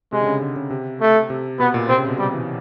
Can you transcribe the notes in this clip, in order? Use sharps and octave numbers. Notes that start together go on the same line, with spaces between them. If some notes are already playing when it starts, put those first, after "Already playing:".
C3 G#3
D3
C#3
D3
C#3
C3
A3
C3
B2 B3
A#2
C3 C4
C#3
B2
C3 G3
E3